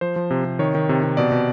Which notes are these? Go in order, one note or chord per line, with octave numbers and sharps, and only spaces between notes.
F3 C5
F3
C3
C3
D#3 C#5
D#3
C3
C3
B2 D5
B2